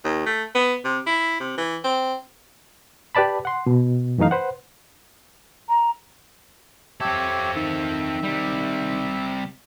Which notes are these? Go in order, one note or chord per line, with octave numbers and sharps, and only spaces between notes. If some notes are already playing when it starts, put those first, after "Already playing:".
D#2
A3
B3
C3
E4
C3
E3
C4
G4 B4 D5 A5 B5
F#5 C6
B2
F#2 E3 A3 D#4 F5
B4 C5 F#5
A#5
C4 G4 A4 C#5 E5
D#3 E5
C3 G3